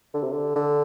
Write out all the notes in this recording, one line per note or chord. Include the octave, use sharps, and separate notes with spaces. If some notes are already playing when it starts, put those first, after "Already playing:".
D3
C3
D3
D3